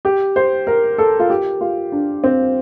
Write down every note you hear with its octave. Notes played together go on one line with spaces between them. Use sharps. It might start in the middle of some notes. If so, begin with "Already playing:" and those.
G4
C5
A#4
A4
F4
G4
F4
D4
C4